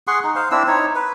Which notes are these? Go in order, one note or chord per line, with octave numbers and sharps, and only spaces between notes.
G#4 F#5 C6 C#6
D#4
C5 F5
C4 D4 E4 E6
D#4 C#5
B4